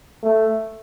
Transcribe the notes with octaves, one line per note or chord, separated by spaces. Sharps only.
A3